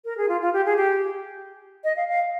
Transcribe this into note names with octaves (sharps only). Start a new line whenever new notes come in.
A#4
G#4
F4
F4
G4
G#4
G4
D#5
F5
F5